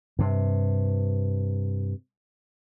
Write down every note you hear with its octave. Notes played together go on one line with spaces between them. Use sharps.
G2 C3